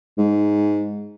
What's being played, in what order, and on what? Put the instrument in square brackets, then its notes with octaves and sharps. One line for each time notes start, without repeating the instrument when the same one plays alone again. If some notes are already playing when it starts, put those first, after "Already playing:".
[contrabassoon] G#2